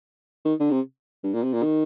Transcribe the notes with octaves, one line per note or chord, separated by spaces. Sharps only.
D#3
D3
C3
G2
A#2
C3
A#2
D#3